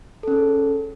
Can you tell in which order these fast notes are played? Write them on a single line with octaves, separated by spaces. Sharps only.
A4 C#4 G#4